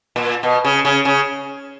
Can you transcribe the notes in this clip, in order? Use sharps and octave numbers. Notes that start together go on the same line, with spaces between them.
A#2
B2
C#3
C#3
C#3